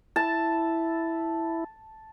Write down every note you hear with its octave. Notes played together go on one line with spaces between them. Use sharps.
E4 A5